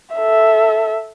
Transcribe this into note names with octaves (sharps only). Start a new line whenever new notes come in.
A4 E5